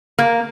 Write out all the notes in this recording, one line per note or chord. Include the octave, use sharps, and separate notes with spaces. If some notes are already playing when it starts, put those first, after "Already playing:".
A#3